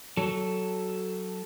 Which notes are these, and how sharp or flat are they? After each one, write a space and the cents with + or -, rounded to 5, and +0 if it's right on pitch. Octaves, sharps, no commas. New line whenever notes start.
F#3 +15 A4 +0